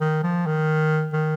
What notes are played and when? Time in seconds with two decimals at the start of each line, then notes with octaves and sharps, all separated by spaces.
0.01 D#3
0.23 F3
0.46 D#3
1.13 D#3